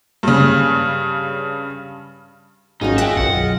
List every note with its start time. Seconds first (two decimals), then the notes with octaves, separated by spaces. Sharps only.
0.23 G2 C#3
2.81 G#1 C#4 D#4 F4 F#4 G#4 D#5
2.98 A3 G#4 E5 F#5 G5 F#6
3.17 B1 F#2 F#5